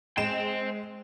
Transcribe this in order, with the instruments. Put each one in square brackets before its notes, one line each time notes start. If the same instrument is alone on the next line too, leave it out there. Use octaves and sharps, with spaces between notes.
[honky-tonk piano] G#3 E7 [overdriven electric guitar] C5 G5